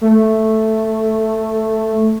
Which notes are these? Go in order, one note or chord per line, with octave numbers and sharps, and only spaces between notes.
A3